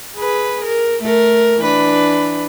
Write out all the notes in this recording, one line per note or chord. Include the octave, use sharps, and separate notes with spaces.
G#4 B4
A#4
A3 A#4
E3 D4 B4